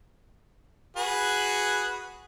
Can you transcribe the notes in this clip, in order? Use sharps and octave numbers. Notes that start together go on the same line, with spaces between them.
F#4 G#4 B4